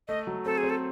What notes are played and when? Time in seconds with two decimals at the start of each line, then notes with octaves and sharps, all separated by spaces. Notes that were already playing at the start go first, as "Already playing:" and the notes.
0.08 A3 D#5
0.27 F#3
0.45 C4 A4
0.58 G#4
0.63 C4
0.70 A4